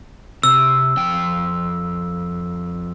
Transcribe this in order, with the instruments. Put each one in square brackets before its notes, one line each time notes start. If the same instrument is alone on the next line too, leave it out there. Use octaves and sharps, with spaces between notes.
[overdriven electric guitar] C3 [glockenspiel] E6
[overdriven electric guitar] F2 G5